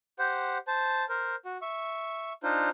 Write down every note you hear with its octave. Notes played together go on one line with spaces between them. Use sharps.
G4 C5 F#5
C5 A5
A#4 C5
F#4
E5 C#6
D4 D#4 F4 C5